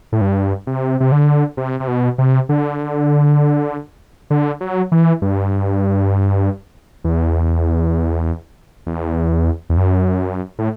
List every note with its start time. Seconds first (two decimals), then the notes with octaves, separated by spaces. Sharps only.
0.12 A2
0.21 G2
0.67 C3
1.00 C3
1.12 D3
1.57 C3
1.80 C3
1.88 B2
2.18 C3
2.49 D3
4.30 D3
4.61 F#3
4.92 E3
5.22 G2
7.04 E2
8.87 E2
9.70 E2
9.77 F#2
10.59 A2